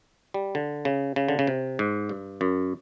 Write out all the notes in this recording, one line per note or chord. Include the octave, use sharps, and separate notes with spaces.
G3
D3
C#3
C#3
D3
C#3
C3
G#2
G2
F#2